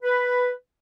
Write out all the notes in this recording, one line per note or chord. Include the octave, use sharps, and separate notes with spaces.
B4